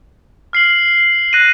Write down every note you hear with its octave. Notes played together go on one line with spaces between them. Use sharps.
F6 C7 F#7
F#6 A#6 D#7